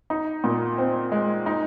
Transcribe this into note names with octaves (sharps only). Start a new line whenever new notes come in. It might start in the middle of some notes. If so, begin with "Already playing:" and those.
D#4
A#2
C4
G#3
D#4